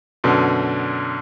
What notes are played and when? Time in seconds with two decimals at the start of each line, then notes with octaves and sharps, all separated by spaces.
0.24 F#2 B2 D3